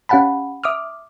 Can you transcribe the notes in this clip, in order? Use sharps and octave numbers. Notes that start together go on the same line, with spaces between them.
C#4 G4 F5 F#5 A5 B5
E5 D6 D#6 F6